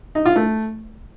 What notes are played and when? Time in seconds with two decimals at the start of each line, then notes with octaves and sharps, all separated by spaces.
0.15 D#4
0.25 F4
0.36 A3